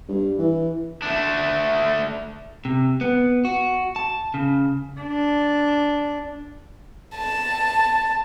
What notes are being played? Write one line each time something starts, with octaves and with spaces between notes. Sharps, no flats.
G2
E3
A3 D4
C3
B3
F#4
A5
C#3
D4
A5